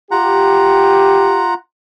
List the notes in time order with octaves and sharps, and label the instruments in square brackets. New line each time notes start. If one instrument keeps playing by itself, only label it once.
[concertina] F4 F#5 A#5 [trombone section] G4